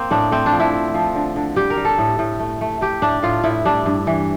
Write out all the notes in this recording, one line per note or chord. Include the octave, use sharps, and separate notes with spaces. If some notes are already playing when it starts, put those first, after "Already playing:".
Already playing: A#3 C4
A2 D4
A3 C4
D4
F3
E4
C4
F3
D3
D3
G3 G4
A#4
G3
A4
A2
A2
A3
A3
A3 G4
A2 D4
A2 F4
A2 E4
G3 D4
G2
E3